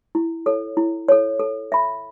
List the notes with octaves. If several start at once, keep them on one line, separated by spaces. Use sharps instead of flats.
E4
A4 C#5
E4
A4 C#5
A4
E5 B5